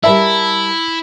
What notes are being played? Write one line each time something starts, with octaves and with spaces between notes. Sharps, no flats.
G3 E4 A#4 E5 A5 B5 E6